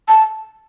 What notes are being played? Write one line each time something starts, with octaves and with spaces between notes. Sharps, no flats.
A5